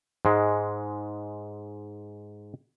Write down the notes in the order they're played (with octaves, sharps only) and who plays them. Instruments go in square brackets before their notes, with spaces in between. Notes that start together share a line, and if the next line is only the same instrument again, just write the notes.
[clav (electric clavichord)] G#2 G#3